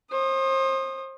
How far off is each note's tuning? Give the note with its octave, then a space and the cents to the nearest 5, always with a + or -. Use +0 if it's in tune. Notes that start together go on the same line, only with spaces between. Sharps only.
C5 +35 D#6 -15